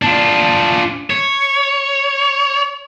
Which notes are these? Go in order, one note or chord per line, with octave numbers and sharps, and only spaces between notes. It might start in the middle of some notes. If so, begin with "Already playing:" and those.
D4 F4
C#5